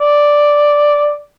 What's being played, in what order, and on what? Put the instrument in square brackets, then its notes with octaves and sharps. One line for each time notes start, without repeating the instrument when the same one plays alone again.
[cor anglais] D5